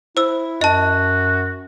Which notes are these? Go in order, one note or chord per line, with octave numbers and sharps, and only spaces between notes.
E4 C5 E6
F#2 F#4 D#5 A5